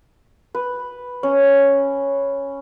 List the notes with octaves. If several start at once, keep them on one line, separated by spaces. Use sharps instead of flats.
B4
C#4